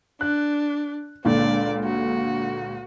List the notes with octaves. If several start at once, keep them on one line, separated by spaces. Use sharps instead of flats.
D4 F#6
C#2 A#2 D3 D4 D5
F#4